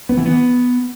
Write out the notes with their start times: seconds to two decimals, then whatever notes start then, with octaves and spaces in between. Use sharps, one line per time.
0.09 B3
0.17 E3
0.25 B3